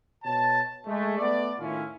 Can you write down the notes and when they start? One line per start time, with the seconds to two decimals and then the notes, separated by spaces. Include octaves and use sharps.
0.24 B2 C#5 A5
0.86 G#3 A3
1.17 A3 B3 D5
1.59 A2 D#3 C#4 E4 F4